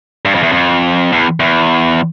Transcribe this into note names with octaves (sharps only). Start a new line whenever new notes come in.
G2
F2
E2
F2
E2
E2